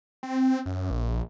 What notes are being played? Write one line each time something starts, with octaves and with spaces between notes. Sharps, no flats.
C4
F#2
A#1